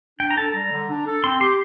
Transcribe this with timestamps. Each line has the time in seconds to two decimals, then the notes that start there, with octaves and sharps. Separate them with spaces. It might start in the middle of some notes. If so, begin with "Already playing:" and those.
0.20 D4 G5
0.31 A#5
0.37 A4 A5
0.54 G3 A#5
0.72 D3
0.89 D4
1.07 A4
1.24 C4 C6
1.40 G4 C6